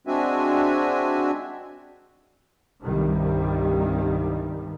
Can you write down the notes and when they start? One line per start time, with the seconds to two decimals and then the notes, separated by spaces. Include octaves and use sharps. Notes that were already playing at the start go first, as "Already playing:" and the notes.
0.07 G#3 C4 D4 F#4 E5 G#5
2.82 C2 G2 D#3 G3